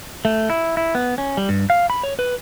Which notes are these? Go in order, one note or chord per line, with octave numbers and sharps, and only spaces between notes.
A3
E4
E4
B3
C#4
G3
G2
F5
B5
C#5
B4